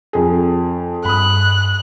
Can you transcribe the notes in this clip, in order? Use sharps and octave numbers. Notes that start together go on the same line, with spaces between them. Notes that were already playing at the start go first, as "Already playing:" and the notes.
F2 G#4
G2 B5 D#6 F#6